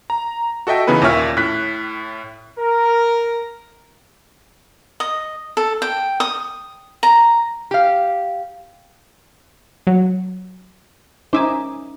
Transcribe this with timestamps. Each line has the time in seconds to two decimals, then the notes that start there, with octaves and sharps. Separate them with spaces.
0.10 A#5
0.67 F#4 A4 D#5 E5 G5
0.87 C#3 E3 B3 D#4 B4
1.02 D#2 A#2 C#4 C#5 E5 F6
1.37 A2 F#6 B6
2.58 A#4
5.00 D#5
5.57 A4
5.82 G5
6.20 D#6
7.03 A#5
7.71 G4 F5
9.87 F#3
11.33 C#4 D#4 C5 E5 G#5 D6